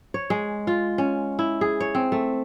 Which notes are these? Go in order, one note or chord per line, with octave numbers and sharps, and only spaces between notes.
C#5
G#3
F4
C#4
E4
G#4
C#5
C4
A3